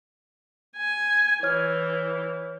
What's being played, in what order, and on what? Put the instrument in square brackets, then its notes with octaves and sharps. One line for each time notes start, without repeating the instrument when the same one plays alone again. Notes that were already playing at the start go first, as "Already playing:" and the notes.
[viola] G#5
[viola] E3 [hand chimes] C#5 F6